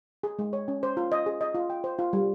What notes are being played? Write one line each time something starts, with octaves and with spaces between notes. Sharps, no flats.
G#4
G#3
C#5
C#4
C5
F4
D#5
G#4
D#5
F4
G5
C5
F4
G3